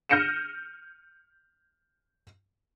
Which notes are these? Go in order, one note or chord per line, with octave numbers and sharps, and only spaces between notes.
F6 G6 A#6 C#7 D#7 E7